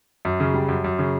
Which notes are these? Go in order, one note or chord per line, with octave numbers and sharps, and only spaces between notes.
F#2
C#3
G3
F#2
F#2
C#3